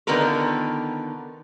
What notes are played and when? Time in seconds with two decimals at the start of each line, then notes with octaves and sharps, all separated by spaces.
0.07 D3 D#3 B3 F4 A#4 B4